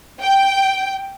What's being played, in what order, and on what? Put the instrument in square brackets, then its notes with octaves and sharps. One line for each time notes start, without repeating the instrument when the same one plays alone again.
[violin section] G5